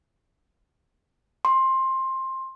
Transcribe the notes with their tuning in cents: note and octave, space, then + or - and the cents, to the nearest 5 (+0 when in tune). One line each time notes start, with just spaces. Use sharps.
C6 +15